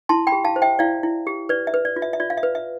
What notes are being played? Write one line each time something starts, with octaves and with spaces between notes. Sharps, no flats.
E4 A5 C6
G5 B5
G4
F5 A5
C5
E5 G5
E4 D5 F5
E4
G4
B4 D5
E5
B4
D5
F4
E5
E5
F4 D5
F5
E5
B4
E5